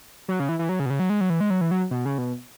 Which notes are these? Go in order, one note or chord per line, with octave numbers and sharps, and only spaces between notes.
F#3
C#3
E3
E3
F#3
C#3
B2
C#3
F#3
G#3
F#3
E3
G#3
F#3
E3
F#3
B2
C#3
B2